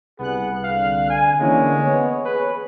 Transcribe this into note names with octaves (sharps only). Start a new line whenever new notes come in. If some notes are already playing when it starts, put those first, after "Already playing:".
C2 B3 G#4 F#6
D3 F5
G#5
D3 E3 G#3 A#3 C#4
B3 C#5
G#4 B4